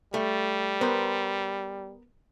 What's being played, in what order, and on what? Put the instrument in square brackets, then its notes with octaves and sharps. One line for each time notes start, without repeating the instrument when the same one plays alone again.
[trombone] G3 [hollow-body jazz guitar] A3
[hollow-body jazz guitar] B3 A#4 C5